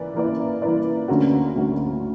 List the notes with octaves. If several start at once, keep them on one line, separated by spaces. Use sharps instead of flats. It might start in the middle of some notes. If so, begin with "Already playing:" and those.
Already playing: E3 A#3 B4 D5
E3 A#3 E4 B4 D5
E3 A#3 E4 B4 D5
D2 D3 A#3 C#4 F#4
D2 D3 A#3 C#4 F#4